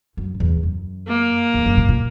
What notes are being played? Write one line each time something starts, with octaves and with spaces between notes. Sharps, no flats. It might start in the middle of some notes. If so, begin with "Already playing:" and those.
F#2
E2
F#2
A#3
E2
F#2
A#2
A#2